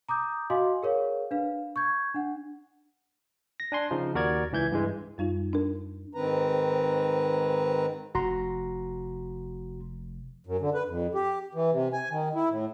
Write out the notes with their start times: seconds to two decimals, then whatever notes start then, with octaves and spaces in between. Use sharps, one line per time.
0.09 A#5 D6 D#6 G6
0.50 F#4 D#5 F5 G#5 C6 D6
0.83 G#4 A#4 C#5 F5
1.31 D4 B4 F5
1.76 C#6 G6 G#6
2.14 D4 F#5
3.60 A#6
3.72 D4 G#5 C6
3.91 C#3 F3 D#4
4.15 D#2 F#4 A#4 D5 G#6
4.52 C#2 E3 G6 G#6
4.72 G2 E3 G#3
5.18 F#2 G3 D#4 F4
5.53 D4 A#4
6.14 G#2 D#3 C4 B4 A#5
8.15 F1 F#4 A#5 C6
10.47 F#2
10.61 D3
10.74 B4
10.88 F2
11.15 G4
11.55 E3
11.71 C3
11.93 G#5
12.11 D#3
12.35 E4
12.50 A2